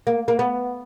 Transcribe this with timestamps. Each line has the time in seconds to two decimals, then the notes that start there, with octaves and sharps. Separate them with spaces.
0.07 A#3
0.28 A#3
0.39 B3